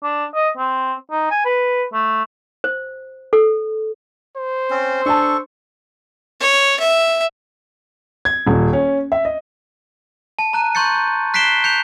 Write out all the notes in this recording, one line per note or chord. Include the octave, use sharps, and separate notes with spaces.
D4
D#5
C4
D#4
G#5
B4
A3
C5
A4
C5
C4 C#4
D4 A4 G#5 A5 C#6
C#5
E5
G#6
D#1
C#4
E5
D#5
A5
A#5 F#6 D#7
C6 C#6 G6 A6 C#7
G6
F#6 B6 C7 D7 E7 G7
G6 C#7 F7